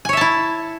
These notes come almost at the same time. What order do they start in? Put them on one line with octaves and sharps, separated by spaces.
G#5 C#5 E5 A5 E4